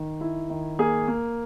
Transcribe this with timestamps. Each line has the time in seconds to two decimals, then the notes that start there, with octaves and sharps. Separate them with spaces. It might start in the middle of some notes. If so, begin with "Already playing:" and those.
Already playing: D#3
0.21 E4
0.50 D#3
0.79 A#3 G#4
1.08 A#3